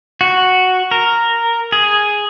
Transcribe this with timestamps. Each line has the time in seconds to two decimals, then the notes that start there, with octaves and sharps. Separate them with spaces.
0.21 F#4
0.91 A#4
1.72 G#4